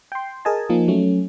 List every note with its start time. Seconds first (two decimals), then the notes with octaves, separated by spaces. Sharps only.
0.12 G5 C6
0.45 G#4 A#4 D#5 G#5 A5
0.70 F3 A#3 D#4
0.88 F#3 A3 C#4